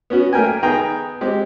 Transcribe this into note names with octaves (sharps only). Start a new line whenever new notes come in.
B3 C#4 F#4
A3 A#3 A#4 G5 G#5
D#3 B3 G#4 G5 A#5
G#3 C4 G4